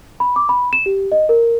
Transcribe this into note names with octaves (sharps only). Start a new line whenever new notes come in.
B5
D6
B5
E7
G4
D#5
A#4